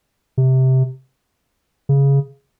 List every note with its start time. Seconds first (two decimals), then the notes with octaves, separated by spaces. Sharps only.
0.38 C3
1.89 C#3